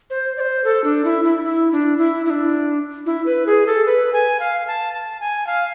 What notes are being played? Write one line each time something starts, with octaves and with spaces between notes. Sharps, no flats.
C5
D5
C5
A4
D4
E4
E4
E4
D4
E4
E4
D4
E4
B4
G#4
A4
B4
G#5
F5
A5
A5
G#5
F5